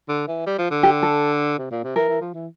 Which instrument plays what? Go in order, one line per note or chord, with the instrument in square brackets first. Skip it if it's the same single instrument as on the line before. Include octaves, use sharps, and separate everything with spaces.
[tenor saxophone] D3
E3
G3
F3
D3
[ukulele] G4
A4
[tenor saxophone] C3
A#2
C3
[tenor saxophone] E3 [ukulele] A#4
[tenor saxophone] E3
F3
E3